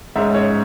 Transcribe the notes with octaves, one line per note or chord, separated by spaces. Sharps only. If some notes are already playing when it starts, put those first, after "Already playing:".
G#2 G#3 C#4 E5
C#5